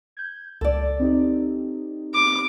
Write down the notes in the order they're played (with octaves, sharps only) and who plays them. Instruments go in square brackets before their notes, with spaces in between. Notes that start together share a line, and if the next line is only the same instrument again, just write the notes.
[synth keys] G6 G#6
[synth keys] C#2 [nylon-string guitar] A4 D5
[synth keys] C4 D#4 G4
[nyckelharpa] D6